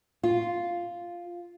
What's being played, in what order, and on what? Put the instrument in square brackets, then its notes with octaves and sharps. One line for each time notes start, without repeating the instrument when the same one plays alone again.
[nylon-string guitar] F4